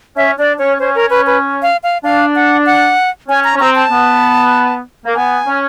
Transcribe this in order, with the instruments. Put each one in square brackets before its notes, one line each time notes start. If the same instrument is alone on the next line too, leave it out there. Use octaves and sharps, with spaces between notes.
[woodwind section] C#4 [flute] E5
[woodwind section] D4 [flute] D5
[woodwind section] C#4 [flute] C#5
[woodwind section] C#4 [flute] C5
[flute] A#4
B4
B4
F5
F5
[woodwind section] D4 [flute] F5
[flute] F#5
F#5
[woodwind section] C#4 [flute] G#5
[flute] A#5
[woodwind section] C#4
[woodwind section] C4 [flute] A#5
[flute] A5
[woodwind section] B3
A#3
[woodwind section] B3 [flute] G#5
[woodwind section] C#4